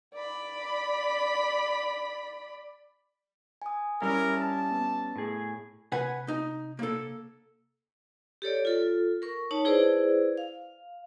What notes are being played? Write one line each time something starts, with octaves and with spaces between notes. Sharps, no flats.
D5 B5
G#5 D#6
G3 C#4 E4 A#4
A5
B3
A2 G#4
C3 B4 F#5 G#5
D#4
A#3 A4
G4 A4 C#5 D5
F4 A4
A#4 C#6
D#4 C#5 A5
E4 G#4 B4 C5 D5
F5